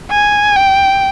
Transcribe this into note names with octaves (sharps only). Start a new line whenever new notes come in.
G#5
G5